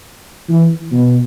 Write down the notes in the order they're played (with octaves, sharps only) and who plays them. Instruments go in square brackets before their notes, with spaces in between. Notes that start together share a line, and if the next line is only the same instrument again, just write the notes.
[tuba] E3
B2